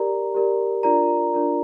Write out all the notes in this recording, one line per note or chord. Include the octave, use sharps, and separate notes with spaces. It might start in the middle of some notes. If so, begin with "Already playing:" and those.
Already playing: G4 A#4 D5 A#5
G4 A#4 D5
D4 F4 A#4 D5 A#5
D4 F4 A#4 D5